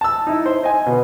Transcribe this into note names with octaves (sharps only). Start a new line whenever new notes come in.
A5 E6
D#4 E4
C5
D#5 G#5
B2